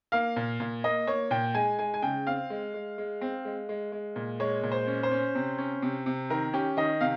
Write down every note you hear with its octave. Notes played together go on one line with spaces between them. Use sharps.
A#3 F5
A#2
A#2
A#3 D#5
A#3 C#5
A#2 G5
G#3 G#5
G#3 G#5
G#5
C#3 G5
C4 F5
G#3
G#3
G#3
C4
G#3
G#3
G#3
A#2
G#3 C#5
A#2
C5
C#4
C5
C#4
C3
C#4
C3
C3
D#3 A#4
C#4 G4
D#3 D#5
C3 F5